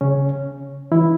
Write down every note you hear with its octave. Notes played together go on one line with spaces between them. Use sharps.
C#3 C#4
E3 E4